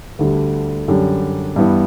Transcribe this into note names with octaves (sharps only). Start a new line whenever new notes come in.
D2 D3 G3
F#2 D3 G3 D4
G2 E3 B3